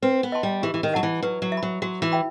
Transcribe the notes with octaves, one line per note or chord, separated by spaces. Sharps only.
C4 B4
B3
D#5 A5 C6
G3
E3 G4
E3
D#3
F#3 D#5 F#5 A5
E3
F#3 B4
F#3
E5
B5
F#3
F#3 F#4
E3
E5 G5 B5